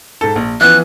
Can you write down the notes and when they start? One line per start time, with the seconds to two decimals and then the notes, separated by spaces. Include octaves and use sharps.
0.21 G#2 A4
0.36 A#1
0.61 E3 F3 B3 F#6